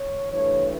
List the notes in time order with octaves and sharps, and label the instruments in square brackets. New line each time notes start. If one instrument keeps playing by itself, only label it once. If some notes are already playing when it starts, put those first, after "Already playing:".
Already playing: [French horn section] C#5
G2 E3 A3 C#5